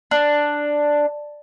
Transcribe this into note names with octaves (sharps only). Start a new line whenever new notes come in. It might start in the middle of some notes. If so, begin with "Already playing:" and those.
D4